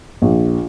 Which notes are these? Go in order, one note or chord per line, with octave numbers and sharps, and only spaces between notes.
A#1